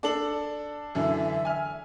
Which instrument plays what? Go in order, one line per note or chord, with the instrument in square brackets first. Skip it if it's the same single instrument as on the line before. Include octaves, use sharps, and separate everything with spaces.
[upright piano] D4 A4 F#7
[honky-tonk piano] F#2 D3 E3 [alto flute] E5
[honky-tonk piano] G#5 F6